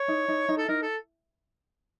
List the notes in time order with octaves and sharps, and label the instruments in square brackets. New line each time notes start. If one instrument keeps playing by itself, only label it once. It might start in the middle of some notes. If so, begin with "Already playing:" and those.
Already playing: [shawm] C#5
[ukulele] D#4
D#4
D#4
[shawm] A4
[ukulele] D#4 [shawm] A#4
[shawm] A4